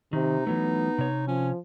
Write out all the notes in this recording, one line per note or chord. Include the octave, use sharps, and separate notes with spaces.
C3 D#3 D#4
E3 F#3 A3 B3
C3 C#5
F3 C#4